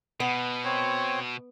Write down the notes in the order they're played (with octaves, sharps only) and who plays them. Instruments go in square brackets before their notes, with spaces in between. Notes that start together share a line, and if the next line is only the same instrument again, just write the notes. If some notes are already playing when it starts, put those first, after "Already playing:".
[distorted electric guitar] B2 [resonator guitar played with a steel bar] B3
[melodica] C4 C#5